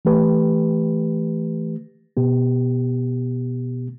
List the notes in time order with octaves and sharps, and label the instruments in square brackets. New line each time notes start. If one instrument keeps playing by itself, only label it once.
[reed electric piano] E3 A3 G4 B4
B2 B3 G4